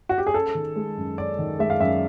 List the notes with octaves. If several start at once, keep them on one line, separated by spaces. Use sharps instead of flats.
F#4
G4
G#4
C#4 A4
D#3
G#3
F#2
C#4 D5
D#3
G#3 E5
F5
F#2 E5